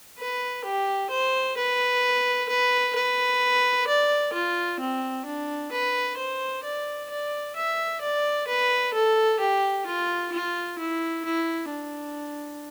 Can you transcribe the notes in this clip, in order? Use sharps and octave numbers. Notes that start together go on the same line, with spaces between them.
B4
G4
C5
B4
B4
B4
D5
F4
C4
D4
B4
C5
D5
D5
E5
D5
B4
A4
G4
F4
F4
E4
E4
D4